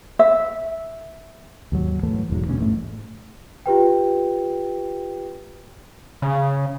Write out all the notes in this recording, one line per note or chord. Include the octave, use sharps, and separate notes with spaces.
E5
D#2 G#2 F#3
G#2 E3 F#3 A3
E1 E2 G#2 F#3
D2 B2 C#4
A1 G#2 A3
F4 G4 B4 G5
C#3